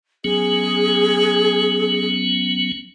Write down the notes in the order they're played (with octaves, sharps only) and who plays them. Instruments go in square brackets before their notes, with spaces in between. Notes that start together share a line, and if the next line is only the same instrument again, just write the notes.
[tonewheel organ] F#3 B3 C#4 [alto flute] G#4